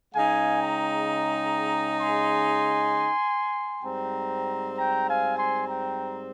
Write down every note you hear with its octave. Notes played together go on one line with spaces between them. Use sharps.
C#3 G#3 D#4 F5 G#5
G5 A#5
G5 A#5
G#5 C6
G#2 G3 C4 G5 A#5
G5 A#5
F5 G#5
G#5 C6
G5 A#5